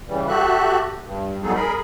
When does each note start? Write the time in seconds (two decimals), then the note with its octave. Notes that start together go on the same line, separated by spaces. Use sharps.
0.08 C#3 E3 G3
0.28 F#4 G4 A4 E5 F#6
1.04 G2
1.43 F#3 G3 B3 D#4 G#4 A4
1.55 G#4 A#4 B5